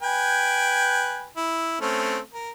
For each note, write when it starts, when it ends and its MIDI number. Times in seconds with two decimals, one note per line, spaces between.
0.02 1.27 71
0.02 1.27 79
0.02 1.27 80
1.37 1.76 64
1.81 2.18 57
1.81 2.18 60
1.81 2.18 61
2.33 2.50 70